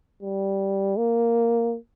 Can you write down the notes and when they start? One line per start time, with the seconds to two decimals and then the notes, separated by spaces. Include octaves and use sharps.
0.23 G3
0.98 A#3